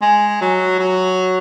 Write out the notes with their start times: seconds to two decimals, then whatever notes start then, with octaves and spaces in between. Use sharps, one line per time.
0.02 G#3
0.41 F#3
0.79 F#3